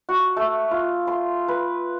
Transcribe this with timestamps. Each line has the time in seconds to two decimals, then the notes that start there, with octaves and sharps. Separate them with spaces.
0.09 F#4
0.37 A3
0.71 F4
1.07 C6
1.48 B4